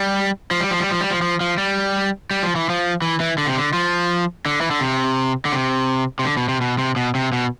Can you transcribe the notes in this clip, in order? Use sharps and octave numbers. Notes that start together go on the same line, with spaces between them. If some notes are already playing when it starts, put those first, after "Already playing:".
Already playing: G3
F3
G3
F3
G3
F3
G3
F3
F3
F3
G3
G3
F3
E3
F3
E3
E3
D3
C3
D3
F3
D3
E3
D3
C3
D3
C3
C3
D3
B2
C3
B2
C3
B2
C3
B2